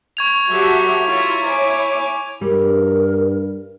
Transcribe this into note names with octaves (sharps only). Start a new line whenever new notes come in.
C#6 G#6 F7
F#3 F#4 G4 A4 E5
E4 F4 C#5 E5 A#5
E4 C#5 G#5 D6
G2 G3 A#4